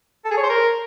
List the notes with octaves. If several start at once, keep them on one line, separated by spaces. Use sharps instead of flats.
A4
G#4
C#5
C5
A#4